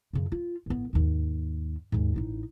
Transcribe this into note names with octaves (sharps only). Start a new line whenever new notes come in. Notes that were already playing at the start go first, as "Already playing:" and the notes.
F#2 C#3
F4
A1 B3
D#2 G#2
D#2 G#2
A1 D#4